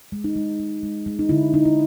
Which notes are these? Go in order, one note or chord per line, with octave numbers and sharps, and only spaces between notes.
G#3
D#4
G#3
G#3
G#3
G#3
D#4
D3 E4
D3 D#4
E4